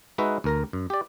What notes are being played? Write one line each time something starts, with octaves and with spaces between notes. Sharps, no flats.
G#3 D#4 F#4 B4 E5
D2 A#4 A#5
F#2
G4 D5